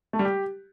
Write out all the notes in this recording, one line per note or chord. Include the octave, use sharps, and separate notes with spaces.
A3
G3
G4